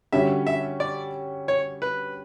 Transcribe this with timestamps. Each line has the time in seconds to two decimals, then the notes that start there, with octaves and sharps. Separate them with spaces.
0.12 D3 G3 C#4 F#4 E5
0.47 E5
0.80 D5
1.48 C#5
1.82 B4